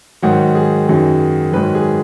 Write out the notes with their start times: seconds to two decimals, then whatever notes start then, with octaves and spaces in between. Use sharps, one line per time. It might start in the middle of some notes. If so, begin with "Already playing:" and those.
0.22 G#2 D#3 F#3 F#5
0.55 G#4
0.88 F#2 D#3 F#3
1.52 G#2 D#3 F#3 B4
1.75 G#4